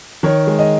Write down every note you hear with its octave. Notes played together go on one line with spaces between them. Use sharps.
D#3 C#5
G#3
D#5